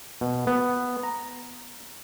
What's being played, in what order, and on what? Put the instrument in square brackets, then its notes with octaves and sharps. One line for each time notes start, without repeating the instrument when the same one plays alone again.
[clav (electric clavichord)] B2
B3
A#5